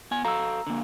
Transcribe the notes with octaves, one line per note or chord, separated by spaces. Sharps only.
B3 G#5
F#4 A4 F5 A#5 E6
D3 A#3